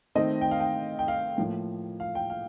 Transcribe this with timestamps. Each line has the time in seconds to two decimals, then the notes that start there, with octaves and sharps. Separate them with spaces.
0.15 D#3 A3 C4 D#5
0.41 G5
0.51 F5
0.60 G5
0.99 G5
1.08 F5
1.38 A2 F3 A#3
2.00 F5
2.15 G5
2.30 F5